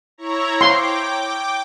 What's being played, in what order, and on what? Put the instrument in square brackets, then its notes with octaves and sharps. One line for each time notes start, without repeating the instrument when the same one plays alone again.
[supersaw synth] E4 C#5 A#5
[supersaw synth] G5 D6 [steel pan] C6